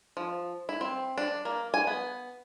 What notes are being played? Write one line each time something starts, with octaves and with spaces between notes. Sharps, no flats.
F3
E4
C4
D4
A#3
G#5
B3